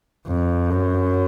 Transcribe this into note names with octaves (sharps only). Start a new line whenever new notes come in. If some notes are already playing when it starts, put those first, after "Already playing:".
F2
F#2